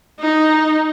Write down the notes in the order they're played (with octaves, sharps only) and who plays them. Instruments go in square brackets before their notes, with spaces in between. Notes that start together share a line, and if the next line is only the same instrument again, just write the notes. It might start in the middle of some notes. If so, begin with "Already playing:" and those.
[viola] D#4